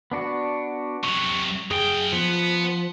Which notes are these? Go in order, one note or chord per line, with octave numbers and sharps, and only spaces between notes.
B3 D4 F#4
C3 F#3 C#6
F#2 G#4 G5
F3 B3